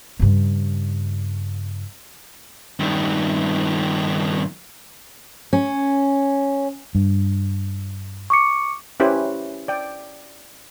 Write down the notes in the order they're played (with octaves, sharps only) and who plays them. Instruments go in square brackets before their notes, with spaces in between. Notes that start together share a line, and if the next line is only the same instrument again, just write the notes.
[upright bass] G2 C#3
[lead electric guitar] G2 D#3
[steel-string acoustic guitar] C#4
[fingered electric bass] G2
[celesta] C#6 D6 C#7
[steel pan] C#4 E4 G4 B4 C5
D5 G5